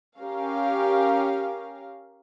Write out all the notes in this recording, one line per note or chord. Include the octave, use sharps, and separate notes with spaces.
C#4 G4 A#4 F5